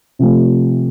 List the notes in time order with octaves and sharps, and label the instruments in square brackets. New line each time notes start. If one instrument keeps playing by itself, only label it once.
[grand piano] C3 F3 A3